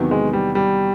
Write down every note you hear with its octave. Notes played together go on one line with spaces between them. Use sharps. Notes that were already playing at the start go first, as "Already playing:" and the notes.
Already playing: E2 C3 D#3 F#3 B3
G#3
G3
G3